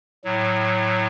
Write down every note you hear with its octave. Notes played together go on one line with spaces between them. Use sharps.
A2 F#3